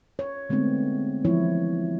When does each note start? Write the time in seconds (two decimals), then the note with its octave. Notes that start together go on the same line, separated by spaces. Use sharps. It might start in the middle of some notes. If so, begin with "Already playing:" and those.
0.19 C#5
0.49 D3 G#3 A3 B3 C4 D#4
1.25 E3 F3 G#3 E4 C#5